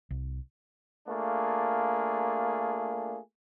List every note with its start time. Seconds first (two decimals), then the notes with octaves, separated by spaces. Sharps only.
0.11 C2
1.07 A3 A#3 D4 F4 G#4